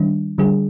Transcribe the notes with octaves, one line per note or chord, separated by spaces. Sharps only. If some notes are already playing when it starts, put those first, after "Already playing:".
Already playing: D#3 G3 D4
D3 G3 D4 G#4